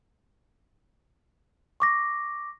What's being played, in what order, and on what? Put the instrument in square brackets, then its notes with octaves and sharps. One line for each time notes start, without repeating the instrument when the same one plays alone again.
[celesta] C#6 D6 A#6